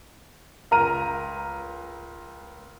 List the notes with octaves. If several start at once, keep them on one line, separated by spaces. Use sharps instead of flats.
C#2 A#4 A#5 D#7